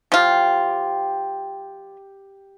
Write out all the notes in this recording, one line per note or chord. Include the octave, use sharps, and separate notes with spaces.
F3 F4 G4 G5